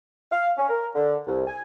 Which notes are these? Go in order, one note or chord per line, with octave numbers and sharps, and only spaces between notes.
F5
C#4
A#4
D3
C2
G#5